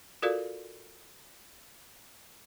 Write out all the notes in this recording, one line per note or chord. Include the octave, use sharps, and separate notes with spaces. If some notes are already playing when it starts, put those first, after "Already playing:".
F4 F#4 A4 A#4 D5 F5